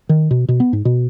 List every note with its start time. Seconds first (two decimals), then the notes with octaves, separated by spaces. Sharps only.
0.09 D#3
0.31 B2
0.48 B2
0.60 B3
0.73 G#2
0.85 B2